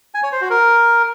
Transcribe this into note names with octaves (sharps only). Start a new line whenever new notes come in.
G#5
C#5
C5
F#4
A#4